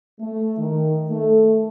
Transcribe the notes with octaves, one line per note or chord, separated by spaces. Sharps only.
A3
D#3
A3